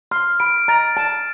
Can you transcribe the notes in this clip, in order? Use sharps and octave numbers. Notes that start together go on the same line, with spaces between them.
C6 F6
B5 D7
A#5 A6
A5 A6